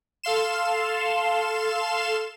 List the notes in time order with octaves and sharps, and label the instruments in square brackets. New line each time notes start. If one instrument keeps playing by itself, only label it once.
[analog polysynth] A4 F5 C6 E7